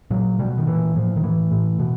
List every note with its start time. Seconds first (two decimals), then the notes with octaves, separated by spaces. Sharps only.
0.11 A#2 F#3
0.39 B2 G3
0.58 D#3
0.67 A#2 E3
0.95 A2 F3
1.16 D#3
1.24 A2 E3
1.52 A2
1.79 B2